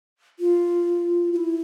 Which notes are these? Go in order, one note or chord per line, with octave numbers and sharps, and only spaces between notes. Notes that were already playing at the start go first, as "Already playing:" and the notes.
F4
F4
E4